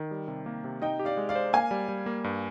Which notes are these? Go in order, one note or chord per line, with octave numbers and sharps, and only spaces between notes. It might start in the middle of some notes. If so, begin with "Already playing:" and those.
Already playing: D#3
G3
C3
A#3
C3
D#4 D#5 G5
G4
D5 F5
G#3
D5 F5
C5
A#3 F5 G#5
G3
G3
A#3
G2